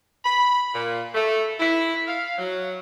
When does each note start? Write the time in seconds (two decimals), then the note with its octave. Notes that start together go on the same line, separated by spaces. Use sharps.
0.24 B5
0.73 A#2
1.15 A3
1.60 E4
2.08 F5
2.38 F#3